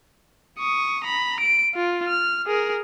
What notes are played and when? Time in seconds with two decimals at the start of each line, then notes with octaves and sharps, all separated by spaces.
0.59 C#6 D#6
1.04 A#5 B5
1.40 D7
1.75 F4
2.07 F6
2.47 G#4 A#4